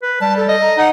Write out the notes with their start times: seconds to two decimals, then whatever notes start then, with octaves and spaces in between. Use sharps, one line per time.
0.03 B4
0.21 G3 A5
0.37 A4
0.49 D#5
0.61 A#5
0.77 D#4 F#5